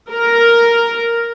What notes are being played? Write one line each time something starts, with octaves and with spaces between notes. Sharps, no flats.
A#4